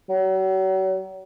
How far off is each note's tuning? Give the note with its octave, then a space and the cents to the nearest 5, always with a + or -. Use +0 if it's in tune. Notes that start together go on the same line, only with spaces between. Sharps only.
F#3 +40